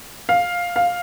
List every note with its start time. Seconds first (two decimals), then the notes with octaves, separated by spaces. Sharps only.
0.29 F5
0.76 F5